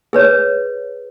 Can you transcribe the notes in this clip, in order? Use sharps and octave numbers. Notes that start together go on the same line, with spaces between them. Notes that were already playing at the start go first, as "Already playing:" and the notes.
G#4 B4 C#5